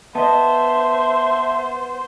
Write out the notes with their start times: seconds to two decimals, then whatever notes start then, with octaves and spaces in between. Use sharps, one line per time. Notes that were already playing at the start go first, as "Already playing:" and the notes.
0.15 B3 C5 D#5 E5 A5